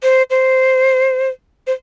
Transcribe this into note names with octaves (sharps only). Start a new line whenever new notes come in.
C5
C5
C5